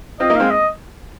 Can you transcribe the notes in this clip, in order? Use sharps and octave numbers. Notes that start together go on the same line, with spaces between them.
C4 F4 D#5
A#3 D#4
G#3 C4 F5
D#5